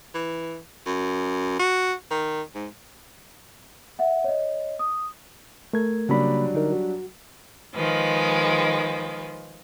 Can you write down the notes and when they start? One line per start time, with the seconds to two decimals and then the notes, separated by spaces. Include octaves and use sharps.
0.14 E3
0.86 F#2
1.59 F#4
2.11 D#3
2.55 G#2
3.99 E5 F#5
4.24 C#5 D#5
4.79 D#6
5.73 A3 A#4 G#6
6.09 C#3 F#3 G3 A#3 D4 B5
6.53 D3 D#4 A#4
6.72 F#4
7.75 D#3 F3 G#3 B4